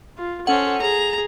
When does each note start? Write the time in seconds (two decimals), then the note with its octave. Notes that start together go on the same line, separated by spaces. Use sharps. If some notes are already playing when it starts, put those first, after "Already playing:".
0.18 F4
0.47 C#4 A4 C5 F#5
0.82 G#4 A#5